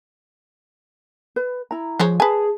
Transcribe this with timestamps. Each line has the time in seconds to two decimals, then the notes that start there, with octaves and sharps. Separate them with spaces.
1.36 B4
1.71 E4 A#5
2.00 F3 G#3 C5 C#5
2.20 G#4 B4 G#5 A5